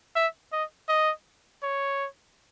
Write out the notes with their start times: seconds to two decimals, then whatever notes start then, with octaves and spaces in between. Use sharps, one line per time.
0.16 E5
0.52 D#5
0.89 D#5
1.63 C#5